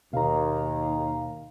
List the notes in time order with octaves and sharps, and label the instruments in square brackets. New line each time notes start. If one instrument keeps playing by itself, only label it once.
[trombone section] D#2 [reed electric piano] B2 [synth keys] F5 A#5